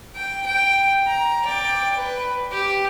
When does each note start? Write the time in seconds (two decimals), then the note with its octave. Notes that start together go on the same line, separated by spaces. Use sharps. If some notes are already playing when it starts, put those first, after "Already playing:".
0.15 G5
0.46 G5
1.07 A#5
1.44 D5 G5
1.98 B4
2.52 G4